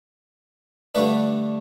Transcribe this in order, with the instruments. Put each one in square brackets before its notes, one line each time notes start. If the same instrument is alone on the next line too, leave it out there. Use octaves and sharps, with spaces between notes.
[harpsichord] G2 D3 A3 D4 B4 D5